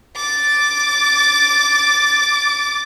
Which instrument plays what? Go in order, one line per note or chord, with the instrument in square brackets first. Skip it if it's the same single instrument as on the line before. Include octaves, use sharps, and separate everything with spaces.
[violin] D6 A6